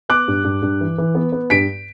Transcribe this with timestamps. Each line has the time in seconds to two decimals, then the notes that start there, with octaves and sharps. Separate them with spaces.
0.09 B3 D6 F#6
0.28 G2
0.44 G2
0.62 G2
0.81 E3
0.98 E3
1.15 B3
1.32 B3
1.50 G2 B6 D7